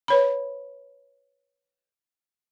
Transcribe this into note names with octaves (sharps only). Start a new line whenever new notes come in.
B4 C#5 B5